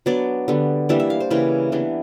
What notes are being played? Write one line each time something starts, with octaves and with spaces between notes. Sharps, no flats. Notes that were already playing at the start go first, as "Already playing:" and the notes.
F#3 B3 D4 D5
D3 G3 B3
E3 G3 A#3 D4 E5
E5
F5
C5
C#3 E3 G3 A#3 B4
E3 G3 B3 D4